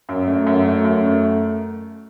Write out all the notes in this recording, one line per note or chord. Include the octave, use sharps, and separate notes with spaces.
F#2
A3
F#2
A3
F#2
A3